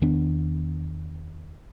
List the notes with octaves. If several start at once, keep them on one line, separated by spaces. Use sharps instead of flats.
E2 D#3 B3 D4